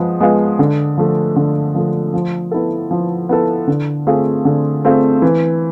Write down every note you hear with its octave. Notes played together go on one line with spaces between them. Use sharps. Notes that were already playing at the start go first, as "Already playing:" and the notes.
Already playing: F3 G#3 B3
G#3 B3 F4
D3
F3 A3
D3
F3 A3
F3
B3 E4 A4
F3
B3 E4 A4
D3
A3 C4 F4 G#4
D3
A3 C4 F4 G#4
E3